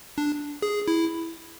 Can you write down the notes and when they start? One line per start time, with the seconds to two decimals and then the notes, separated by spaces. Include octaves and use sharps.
0.18 D4
0.62 G#4
0.88 E4